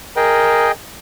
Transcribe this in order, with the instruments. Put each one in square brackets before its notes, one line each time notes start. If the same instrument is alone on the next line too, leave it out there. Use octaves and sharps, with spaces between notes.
[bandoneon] G#4 D#5 G5 [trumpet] A#4